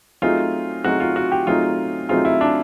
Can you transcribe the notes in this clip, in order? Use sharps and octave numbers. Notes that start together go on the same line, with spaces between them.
F#3 A3 C4 D#4 F4 G#4
F#3 A3 C4 D#4 F#4 G#4
F4
F#4
G4
F#3 A3 C4 D#4 F4 G#4
F#3 A3 C4 D#4 F4 G#4
E4
D4